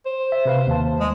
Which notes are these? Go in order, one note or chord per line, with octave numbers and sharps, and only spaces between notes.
C5
E5
C3 B4 F5
D#2 A5
G#3